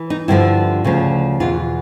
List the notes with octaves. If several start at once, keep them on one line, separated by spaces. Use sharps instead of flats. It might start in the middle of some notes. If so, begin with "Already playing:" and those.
Already playing: E3
D#4
G2 D3 F3 E4
D2 C#3 F3
E2 B2 F4